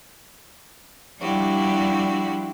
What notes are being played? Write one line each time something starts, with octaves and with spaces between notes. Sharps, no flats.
F3 G3 D4 E4 F#4 G4